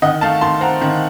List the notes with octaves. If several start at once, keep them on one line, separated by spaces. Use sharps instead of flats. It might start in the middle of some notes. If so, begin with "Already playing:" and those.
D#3 D#5 F#5
A3 F5 A5
D#3 A5 C6
C4 F#5 A#5
D#3